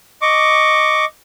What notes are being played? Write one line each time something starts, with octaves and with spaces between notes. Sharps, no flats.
D#5 C#6 D6